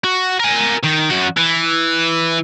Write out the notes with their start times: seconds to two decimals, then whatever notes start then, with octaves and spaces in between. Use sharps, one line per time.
0.04 F#4
0.40 A#4 G#5
0.84 D#3
1.11 F#2 F#4
1.37 E3